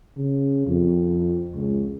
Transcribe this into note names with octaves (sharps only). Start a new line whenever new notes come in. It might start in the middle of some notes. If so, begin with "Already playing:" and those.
C#3
F2
C#2